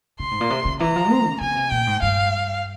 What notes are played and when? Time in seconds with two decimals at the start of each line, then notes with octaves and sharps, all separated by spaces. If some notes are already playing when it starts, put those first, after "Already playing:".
0.19 C#3 C6
0.31 G#2
0.41 A#2
0.50 C3
0.65 C#3
0.80 E3 A#5
0.96 F3
1.11 C4
1.26 C#3
1.41 C#3 G#5
1.56 C3
1.71 A#2 G5
1.87 G#2
2.02 G2 F5